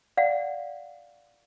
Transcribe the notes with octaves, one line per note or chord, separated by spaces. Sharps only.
D5 F5 F#5